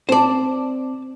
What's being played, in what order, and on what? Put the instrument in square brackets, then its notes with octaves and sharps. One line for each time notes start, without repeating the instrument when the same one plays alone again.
[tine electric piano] C4 [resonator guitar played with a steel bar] E4 A5 [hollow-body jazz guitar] C5 D5